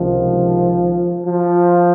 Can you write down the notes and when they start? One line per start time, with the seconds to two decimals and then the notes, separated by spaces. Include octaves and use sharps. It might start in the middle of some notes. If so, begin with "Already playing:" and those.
Already playing: C#2 C3 D#3 F3
1.26 F3